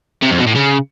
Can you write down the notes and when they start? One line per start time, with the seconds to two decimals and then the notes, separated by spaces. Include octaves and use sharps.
0.23 C3
0.31 F2
0.39 B2
0.47 A2
0.55 C#3